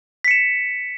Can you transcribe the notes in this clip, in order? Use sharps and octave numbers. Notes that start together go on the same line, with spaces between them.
B6 C#7 E7